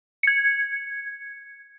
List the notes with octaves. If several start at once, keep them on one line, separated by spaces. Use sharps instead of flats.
G#6 C#7